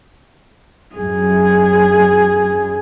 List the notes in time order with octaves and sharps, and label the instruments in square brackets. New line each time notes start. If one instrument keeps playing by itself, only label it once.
[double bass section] F#2 [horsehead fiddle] G#4